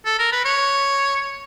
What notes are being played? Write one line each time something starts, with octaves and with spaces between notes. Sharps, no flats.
A4
A#4
B4
C#5